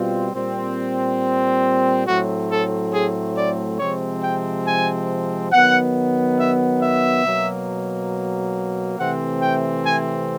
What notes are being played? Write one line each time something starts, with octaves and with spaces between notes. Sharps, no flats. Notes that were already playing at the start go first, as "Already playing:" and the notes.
Already playing: B2 G3 C4 F4
A#2 G3 C4
A2 F#3 A3 C4 F#4
A4
G#4
D5
C3 F3 G#3 C4 C#5
G5
G#5
D#3 F#3 B3 F#5
E5
E5
B2 F#3 A#3
C3 E3 A3 C4 F#5
G5
G#5